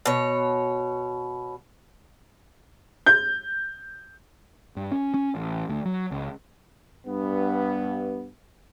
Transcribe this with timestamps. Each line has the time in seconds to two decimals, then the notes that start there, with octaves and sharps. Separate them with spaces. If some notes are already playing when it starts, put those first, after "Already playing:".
0.06 B2 C#5
3.06 G6
4.76 G2
4.92 C#4
5.14 C#4
5.35 A1
5.69 D2
5.85 F#3
6.11 C#2
7.07 G2 B3